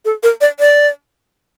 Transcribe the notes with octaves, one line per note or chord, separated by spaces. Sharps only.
A4
A#4
D5
D5